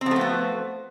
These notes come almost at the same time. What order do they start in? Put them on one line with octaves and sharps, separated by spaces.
C4 F3 A3 B3 F#4